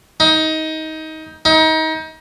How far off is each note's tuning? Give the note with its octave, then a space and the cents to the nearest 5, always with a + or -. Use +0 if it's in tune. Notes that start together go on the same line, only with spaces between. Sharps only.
D#4 +20
D#4 +30